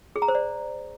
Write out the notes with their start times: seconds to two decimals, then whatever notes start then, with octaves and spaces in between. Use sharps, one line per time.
0.16 G#4
0.22 A#5
0.28 C5
0.35 D5